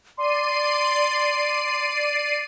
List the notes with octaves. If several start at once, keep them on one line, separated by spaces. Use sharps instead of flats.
D5 C6 C7 D#7